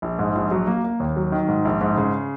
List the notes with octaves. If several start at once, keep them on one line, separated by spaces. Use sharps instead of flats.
A#1
G#2
A#1
F#3
A#3
A#3
D#2
F#3
D#3
G#2
A#1
G#2
C#3